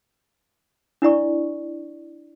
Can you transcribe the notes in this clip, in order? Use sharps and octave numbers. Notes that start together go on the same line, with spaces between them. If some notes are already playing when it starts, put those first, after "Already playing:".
D4 E4 D5 C#6